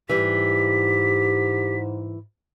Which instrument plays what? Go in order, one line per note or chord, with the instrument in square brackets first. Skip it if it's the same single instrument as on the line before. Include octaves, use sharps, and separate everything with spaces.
[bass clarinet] G#2 [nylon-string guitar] E3 G3 [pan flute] G4 [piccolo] B6